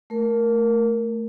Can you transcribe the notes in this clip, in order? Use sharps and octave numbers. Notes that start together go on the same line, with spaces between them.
A3 A#4